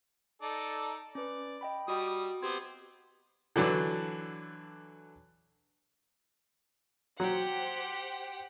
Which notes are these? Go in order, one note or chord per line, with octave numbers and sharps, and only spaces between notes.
D#4 A4 D5
C#4 B4 D5
D#5 G5 B5
G3 F#4 D#5 D#6
B3 C4 G4 C5 G#6
D3 E3 F#3 D4
F#3 G4 C5 F#5